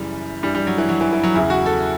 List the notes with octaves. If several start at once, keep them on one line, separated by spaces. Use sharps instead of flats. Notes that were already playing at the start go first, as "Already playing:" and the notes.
Already playing: F#2 C#3 E3 G3
G2 E3 G3
G3
F#3
E3
F#3
E3
E3
F#3
E2 C#3 E3 E4
F#4
A4